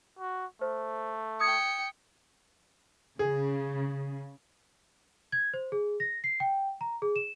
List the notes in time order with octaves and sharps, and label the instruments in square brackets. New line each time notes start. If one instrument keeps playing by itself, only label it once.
[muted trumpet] F#4
[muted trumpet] A3 [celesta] C5
[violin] G5 C#7 [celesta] D#6 G#6
[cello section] C#3 [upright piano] G#4
[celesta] G#6
C5
G#4
A#6
C7
G5
A#5
G#4
E7